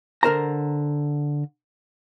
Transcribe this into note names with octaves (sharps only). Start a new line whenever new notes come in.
D3 A#4 C5 A#5